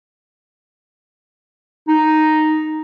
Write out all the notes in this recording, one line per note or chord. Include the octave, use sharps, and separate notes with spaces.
D#4